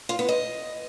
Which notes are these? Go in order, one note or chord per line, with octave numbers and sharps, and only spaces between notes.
F4
B3
D#5